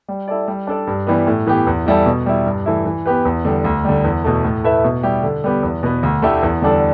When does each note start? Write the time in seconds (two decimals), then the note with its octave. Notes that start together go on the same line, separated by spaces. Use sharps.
0.08 G3
0.28 E4 A4 D5
0.48 G3
0.67 D4 A4 D5
0.87 G2
1.07 E3 G3 B3
1.27 A2
1.46 E3 B3 G4
1.67 E2
1.86 E3 G3 E4 A4
2.06 B2
2.26 G3 E4
2.46 G2
2.66 E3 A3 E4
2.86 E3
3.06 B3 G4 B4
3.25 E2
3.45 D3 G3
3.64 D2
3.85 D3 G3
4.04 E2
4.24 B2 A3
4.44 A2
4.64 A3 E4 B4 E5
4.84 B2
5.03 G3 E4 G4
5.23 D3
5.44 G3 B3 G4
5.63 E2
5.83 B2 B3
6.03 D2
6.22 D3 A3 E4 G4
6.43 E2
6.62 D3 G3 D4 A4